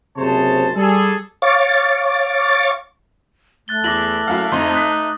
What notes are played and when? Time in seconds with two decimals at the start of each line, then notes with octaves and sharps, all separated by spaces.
0.17 F#1 C3 G#4 C5 C#5 A5
0.75 G3 G#4 A4
1.42 C#5 F5 C#6 D6 A6
3.68 A3 F#6 A6 G7
3.84 E2 E4 D6 A#6 F#7
4.27 F#2 E4 F#4 F5
4.52 F2 D#4 C6
4.73 D#6 F#6 B6